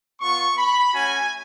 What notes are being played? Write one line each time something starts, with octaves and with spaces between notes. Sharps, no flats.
B3 F4 C#6
B5
A3 C#4 F#4 G#5